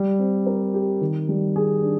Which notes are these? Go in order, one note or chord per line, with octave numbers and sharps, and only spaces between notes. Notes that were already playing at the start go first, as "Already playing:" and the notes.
Already playing: G3
C4
A#4
G4
D#3
G3
G#4
D4